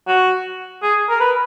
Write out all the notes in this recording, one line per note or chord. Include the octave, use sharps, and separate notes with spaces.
F#4
G#4
A#4
B4